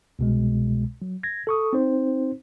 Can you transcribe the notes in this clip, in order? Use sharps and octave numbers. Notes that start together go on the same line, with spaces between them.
C2 B2 G#3
F#3
G#6 A#6
A4 C#6 D#6
C4 D#4 C5